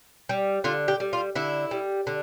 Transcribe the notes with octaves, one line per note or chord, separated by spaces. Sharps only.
G3
D3 F4
G4
G3
F4
D3 E4
G3
D3